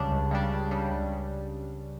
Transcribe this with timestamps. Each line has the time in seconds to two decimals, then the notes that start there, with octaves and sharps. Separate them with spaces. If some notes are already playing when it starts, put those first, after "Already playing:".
Already playing: C#2 C#3 G3 D4
0.12 C#2
0.31 C#3 G3 D4
0.51 C#2
0.71 C#3 G3 D4
0.91 C#2